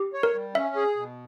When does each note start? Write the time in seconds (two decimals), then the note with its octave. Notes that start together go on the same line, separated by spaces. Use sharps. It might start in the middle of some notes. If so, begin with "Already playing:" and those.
Already playing: G4
0.13 C#5
0.23 A#4
0.34 G3
0.55 C#4 E5
0.76 G#4
0.96 B2